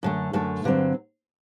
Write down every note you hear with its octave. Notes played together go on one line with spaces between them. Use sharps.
F#2 D3 A3
F#2 D3 A3
G2 D3 F#3 C4